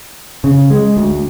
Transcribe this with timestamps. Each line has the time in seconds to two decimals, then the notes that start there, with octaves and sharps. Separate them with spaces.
0.44 C#3
0.70 G#3
0.97 D2